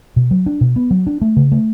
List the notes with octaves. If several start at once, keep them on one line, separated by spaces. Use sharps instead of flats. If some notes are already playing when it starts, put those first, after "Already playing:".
B2
F#3
D4
B2
B3
F#3
D4
A3
C#3
A3